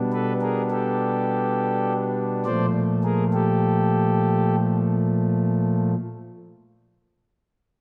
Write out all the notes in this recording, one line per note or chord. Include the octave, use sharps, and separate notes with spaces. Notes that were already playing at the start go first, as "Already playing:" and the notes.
Already playing: B2 G3 B3 D4
A4 B4
G#4 A#4
G4 A4
A#2 F3 A3 C5 D5
G#4 A#4
G4 A4